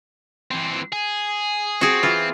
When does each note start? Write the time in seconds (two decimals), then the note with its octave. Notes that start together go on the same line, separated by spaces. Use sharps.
0.51 E3 C4
0.92 G#4
1.81 C4 F#4 G#4
2.03 E3 F4